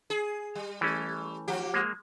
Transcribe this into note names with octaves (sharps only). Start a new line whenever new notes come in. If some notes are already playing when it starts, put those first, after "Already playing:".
G#4
G3
E3 A3 C#4
F3 G4
G#3 A#3